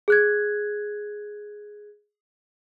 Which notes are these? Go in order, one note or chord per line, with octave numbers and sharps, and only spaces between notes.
G#4 F#6 G#6